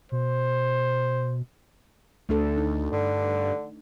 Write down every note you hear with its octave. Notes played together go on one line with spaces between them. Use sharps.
B2 C5
D2 A3 D4 A4
D#4
G2 D3